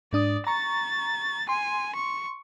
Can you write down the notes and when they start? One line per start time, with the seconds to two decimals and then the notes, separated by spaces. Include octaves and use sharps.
0.13 G#2 D4 D5 D#6
0.47 A#5 C#6 A6
1.49 G#5 C6
1.96 C#6